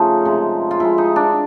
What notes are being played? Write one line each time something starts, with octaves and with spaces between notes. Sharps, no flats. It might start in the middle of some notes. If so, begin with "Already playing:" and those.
Already playing: C#3 F3 A3 D#4 F4
C3 F3 G#3
F4
C3 F3 G#3 E4
D#4
D4